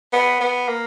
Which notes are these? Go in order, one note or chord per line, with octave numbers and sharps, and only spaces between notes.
B3
B3
A#3